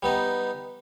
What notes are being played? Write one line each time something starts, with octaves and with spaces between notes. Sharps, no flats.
G3 B3 D#4